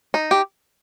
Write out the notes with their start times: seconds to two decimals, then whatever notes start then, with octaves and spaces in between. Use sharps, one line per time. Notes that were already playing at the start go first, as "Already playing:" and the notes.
0.14 D#4
0.31 G4